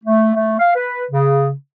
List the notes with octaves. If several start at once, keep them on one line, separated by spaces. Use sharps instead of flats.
A3
A3
F5
B4
C#3